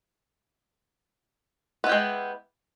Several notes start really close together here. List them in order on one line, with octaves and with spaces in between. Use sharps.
B3 E4 G4 G#3